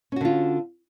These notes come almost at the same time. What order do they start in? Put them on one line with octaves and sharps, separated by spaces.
C#4 F#4 D3 F4